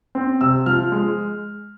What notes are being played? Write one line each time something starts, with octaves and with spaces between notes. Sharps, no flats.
C4
C3 E6
F3 F6
G#3